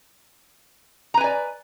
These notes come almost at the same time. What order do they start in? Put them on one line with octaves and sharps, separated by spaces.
A#5 B4 G#5 D5